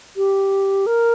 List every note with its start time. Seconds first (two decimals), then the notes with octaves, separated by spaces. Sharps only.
0.17 G4
0.86 A#4